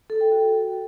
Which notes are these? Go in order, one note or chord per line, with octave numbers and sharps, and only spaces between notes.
A4
G5
F#4